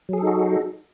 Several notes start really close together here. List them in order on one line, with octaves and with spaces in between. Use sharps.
F#3 G#4 A4 D#4 F#4